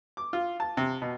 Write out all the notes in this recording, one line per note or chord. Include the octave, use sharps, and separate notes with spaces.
D6
F4
A5
C3
B2